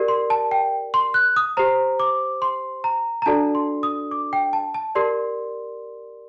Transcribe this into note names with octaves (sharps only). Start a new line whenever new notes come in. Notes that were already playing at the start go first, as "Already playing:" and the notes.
Already playing: G4 A#4 D5
C6
A5
G5
C6
F#6
D#6
G4 C5 A#5
D6
C6
A#5
A#5
D4 F#4 A4 D5 A5
C6
D#6
D6
G5
A5
A5
G4 A#4 D5 C6